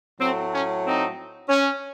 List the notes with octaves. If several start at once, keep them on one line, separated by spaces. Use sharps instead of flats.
A2 F#3 A3 C4
C#4
C4 D#4
C#4